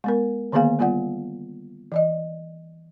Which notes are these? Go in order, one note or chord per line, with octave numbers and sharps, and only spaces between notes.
G#3 B3 A#4
D3 D#3 A#3 B3 G#4 F5
G3 B3 F4 D5 F#5
E3 D5 D#5